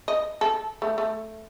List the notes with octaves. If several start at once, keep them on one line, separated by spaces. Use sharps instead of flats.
D#5
A4
A3
A3